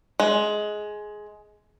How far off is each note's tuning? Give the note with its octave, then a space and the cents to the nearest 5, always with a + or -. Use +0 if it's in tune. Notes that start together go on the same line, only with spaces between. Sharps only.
G#3 +15